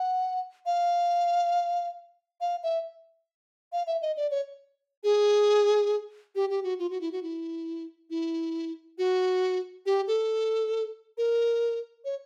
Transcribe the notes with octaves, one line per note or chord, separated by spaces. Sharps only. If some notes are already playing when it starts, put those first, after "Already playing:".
Already playing: F#5
F5
F5
E5
F5
E5
D#5
D5
C#5
G#4
G4
G4
F#4
F4
F#4
E4
F#4
E4
E4
F#4
G4
A4
A#4
C#5